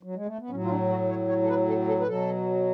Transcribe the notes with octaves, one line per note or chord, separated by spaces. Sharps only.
F#3
G#3
A3
B3
A2 F#3 C#4
F4
D4
F#4
C#5
C#5
A4
B4
A4
A4
B4
B2 F#3 A4